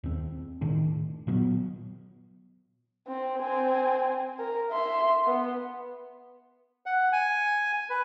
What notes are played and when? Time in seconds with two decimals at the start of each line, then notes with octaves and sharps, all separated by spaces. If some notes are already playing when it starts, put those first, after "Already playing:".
0.04 D#2 C4
0.61 A2 D#3 D4
1.27 A#2 F#3 B3
3.07 C4
3.39 C4 G#5
4.39 A#4
4.70 E5 C6
5.26 B3
6.86 F#5
7.13 G#5
7.90 B4